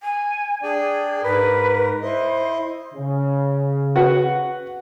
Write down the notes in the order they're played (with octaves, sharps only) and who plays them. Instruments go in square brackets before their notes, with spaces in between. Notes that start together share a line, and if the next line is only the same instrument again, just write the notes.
[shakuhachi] G#5
[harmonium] D4 D5 G5 [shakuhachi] G#4
[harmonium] G#2 A#4 [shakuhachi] B4
[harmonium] E4 D#5 [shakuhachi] C5
[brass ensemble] C#3
[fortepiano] F#4 B4 F#5